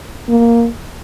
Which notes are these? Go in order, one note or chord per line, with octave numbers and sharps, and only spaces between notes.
A#3